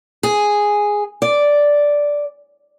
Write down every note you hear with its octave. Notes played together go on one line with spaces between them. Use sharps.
G#4
D5